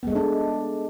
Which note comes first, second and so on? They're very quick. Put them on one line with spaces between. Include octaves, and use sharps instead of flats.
B3 G#3 A3 D4